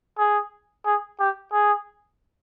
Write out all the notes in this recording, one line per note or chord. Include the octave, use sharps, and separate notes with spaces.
G#4
G#4
G4
G#4